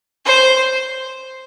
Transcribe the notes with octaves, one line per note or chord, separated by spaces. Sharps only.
C5